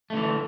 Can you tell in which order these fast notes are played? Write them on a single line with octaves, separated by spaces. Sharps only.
A3 D3 E3